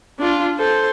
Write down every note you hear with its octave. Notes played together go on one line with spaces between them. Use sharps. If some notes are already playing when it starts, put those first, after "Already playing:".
D4 F4
A4 C5